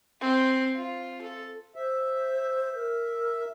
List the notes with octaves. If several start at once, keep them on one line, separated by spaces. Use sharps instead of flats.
C4
F4
A4
C5 E5
A#4